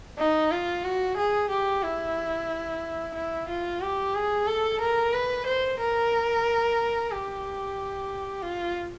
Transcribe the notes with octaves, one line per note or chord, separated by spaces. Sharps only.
D#4
F4
F#4
G#4
G4
E4
E4
F4
G4
G#4
A4
A#4
B4
C5
A#4
G4
F4